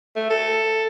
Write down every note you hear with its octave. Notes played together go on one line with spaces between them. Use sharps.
A3
A4